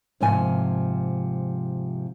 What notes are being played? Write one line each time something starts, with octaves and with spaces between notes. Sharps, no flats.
G#2 C3 F3 G#5